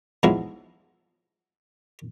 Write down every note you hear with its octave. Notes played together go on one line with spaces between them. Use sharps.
G#2 F3 F#3 G#3 B3 E4